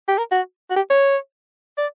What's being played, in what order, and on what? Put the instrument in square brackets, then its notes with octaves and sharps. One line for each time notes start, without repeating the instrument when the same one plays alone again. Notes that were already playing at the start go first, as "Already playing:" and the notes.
[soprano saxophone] G4
A#4
F#4
F#4
G4
C#5
D5